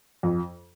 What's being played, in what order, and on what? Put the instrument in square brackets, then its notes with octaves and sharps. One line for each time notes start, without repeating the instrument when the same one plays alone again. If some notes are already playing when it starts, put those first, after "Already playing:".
[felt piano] F2